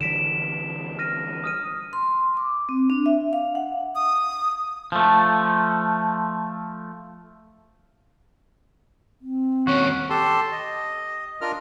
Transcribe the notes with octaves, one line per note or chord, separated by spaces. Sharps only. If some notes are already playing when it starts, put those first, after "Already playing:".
D3 E3 G3 B6 D7 E7
F6 A#6 D#7
D#6 F6 D#7
C6
D6
C4
D4
E5
F5
F#5
D#6
F3 A3
C4
D#2 C#4 F#4
G4 A4 A5 C6
D#5
D4 F4 A#4 D#5 F6